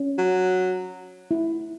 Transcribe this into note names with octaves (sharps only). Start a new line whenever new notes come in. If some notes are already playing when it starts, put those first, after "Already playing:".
Already playing: C#4
F#3
E4